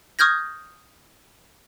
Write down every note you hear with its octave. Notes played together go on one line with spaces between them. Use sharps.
C#6 D#6 F6 G6 G#6 A#6